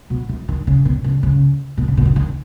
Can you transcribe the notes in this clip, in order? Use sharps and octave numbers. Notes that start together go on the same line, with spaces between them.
B2
E3
D#3
C#3
B2
C#3
C#3
B2
C#3
B2
C#3
D#3